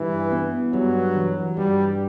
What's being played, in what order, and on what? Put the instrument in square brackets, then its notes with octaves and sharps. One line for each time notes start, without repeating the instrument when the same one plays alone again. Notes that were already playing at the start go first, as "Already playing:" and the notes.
Already playing: [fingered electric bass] G2 [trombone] E3
[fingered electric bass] B3
[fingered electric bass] G2 [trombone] F#3
[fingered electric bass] E3
[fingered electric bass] G2 [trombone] G3